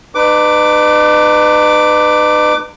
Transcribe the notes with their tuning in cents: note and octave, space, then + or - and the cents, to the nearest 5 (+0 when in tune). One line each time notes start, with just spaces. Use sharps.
D#4 -45 B4 +15 D6 +0